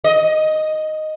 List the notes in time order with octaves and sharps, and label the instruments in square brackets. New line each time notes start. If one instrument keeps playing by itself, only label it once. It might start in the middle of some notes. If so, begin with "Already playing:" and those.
[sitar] D#5